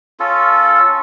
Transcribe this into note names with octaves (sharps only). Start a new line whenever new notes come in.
C#4 F4 A4